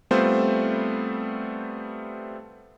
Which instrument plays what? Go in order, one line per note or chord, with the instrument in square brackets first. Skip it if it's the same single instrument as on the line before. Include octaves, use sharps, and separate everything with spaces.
[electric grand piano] G3 A3 B3 C4 F4 C5